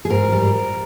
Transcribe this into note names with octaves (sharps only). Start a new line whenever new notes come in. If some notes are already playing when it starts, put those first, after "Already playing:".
G#4
G#2 A#4
G3